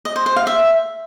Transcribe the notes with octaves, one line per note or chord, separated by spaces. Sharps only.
D#5
C5
C5
F5
E5